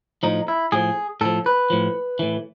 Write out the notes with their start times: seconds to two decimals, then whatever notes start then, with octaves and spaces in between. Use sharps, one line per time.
0.23 A2 F3 D#4
0.48 E4
0.72 A2 F3 G#4
1.21 A2 F3 A4
1.46 B4
1.70 A2 F3
2.19 A2 E3